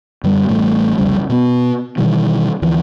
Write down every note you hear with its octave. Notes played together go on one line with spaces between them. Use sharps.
F#2 D3 G3
A1 A2 G3 A3
C2 F2 C#3 G3
B2 B3
B2 D#3 E3 G3
D2 E3 F3